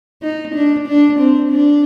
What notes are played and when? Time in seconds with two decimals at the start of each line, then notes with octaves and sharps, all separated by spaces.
0.22 D#4
0.54 D4
0.87 D4
1.19 C4
1.51 D4